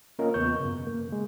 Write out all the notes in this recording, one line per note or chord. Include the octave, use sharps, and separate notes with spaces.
A#3 C#4 F4 A#4 D#5
E2 C#3 B3 C#6 G6
F#2 C#3
A#3
C#3 G#3